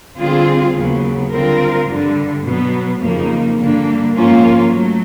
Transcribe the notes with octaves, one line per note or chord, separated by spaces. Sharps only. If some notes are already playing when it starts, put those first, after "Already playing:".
D3 G3 C4 F4 G#4
D#2 C#3 F#3 B3
D3 G3 C4 F4 A#4
G2 D3 G3
B2 F#3 B3
F2 C#3 F3 A#3 D#4
G2 D3 G3 A#3 D4
G#2 F3 A#3 C#4 F4
F#3 A3